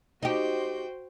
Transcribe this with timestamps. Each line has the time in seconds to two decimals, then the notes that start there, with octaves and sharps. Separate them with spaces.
0.23 D#4 F#4 G4 C5 G5